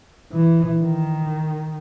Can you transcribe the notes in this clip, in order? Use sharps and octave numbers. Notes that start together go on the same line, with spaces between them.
E3
D#3